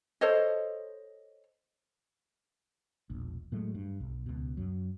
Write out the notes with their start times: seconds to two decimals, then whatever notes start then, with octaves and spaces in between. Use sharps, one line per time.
0.21 A4 C5 C#5 D#5
3.10 E1 A#1
3.52 A2 F#3 G#3 A3
3.75 G2
4.00 B1
4.26 C#2 B2
4.57 F#2 F#3